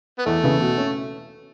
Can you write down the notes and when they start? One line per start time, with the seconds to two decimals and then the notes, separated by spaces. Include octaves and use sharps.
0.19 B3
0.26 E2 A3
0.43 C#3 E3 B3 E4
0.61 B2
0.78 C#4